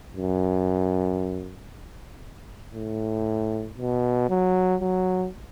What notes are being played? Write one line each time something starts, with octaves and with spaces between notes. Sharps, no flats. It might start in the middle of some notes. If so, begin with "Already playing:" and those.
F#2
A2
B2
F#3
F#3